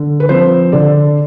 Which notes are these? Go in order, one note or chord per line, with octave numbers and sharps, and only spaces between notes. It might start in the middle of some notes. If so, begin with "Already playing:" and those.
Already playing: D3
B4
F3 C4 C5
D3 D5